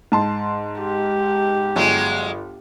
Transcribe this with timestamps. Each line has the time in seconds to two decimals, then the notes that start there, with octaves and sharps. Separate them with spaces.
0.12 G#2 A5 C6
0.81 G4
1.76 G1 F#3 G#3